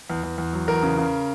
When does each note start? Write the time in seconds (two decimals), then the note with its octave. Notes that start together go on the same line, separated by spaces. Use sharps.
0.10 E2
0.23 E2
0.38 E2
0.53 F#3
0.68 E2 A#4
0.83 C#3
0.97 C#3